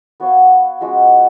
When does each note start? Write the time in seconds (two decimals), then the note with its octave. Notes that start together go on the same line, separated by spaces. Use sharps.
0.20 B3 F#4 C#5 F5
0.81 F3 G#3 C#4 F#4